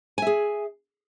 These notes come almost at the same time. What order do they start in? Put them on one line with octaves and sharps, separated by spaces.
G#5 E5 G#4